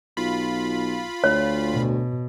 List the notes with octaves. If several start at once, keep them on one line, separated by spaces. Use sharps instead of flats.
B1 F4 B5
D2 C#5
B2